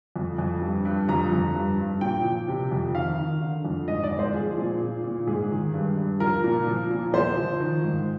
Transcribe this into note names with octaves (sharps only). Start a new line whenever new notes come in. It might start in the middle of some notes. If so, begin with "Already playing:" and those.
F2
F2
G2
G2
F2 A#5
F2
G2
G2
A#2 G5
F3
C3
F2
D#3 F5
D#3
D3
F2
G#2 D#5
D5
G#2
C5
F3 G#4
A#2
A#2
A#2
G#2 G#4
D#3
G2
G2
F3 A#4
A#2
F3
A#2
F3 C5
F3
D#3
G#2